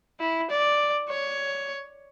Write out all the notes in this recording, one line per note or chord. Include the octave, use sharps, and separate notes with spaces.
E4
D5
C#5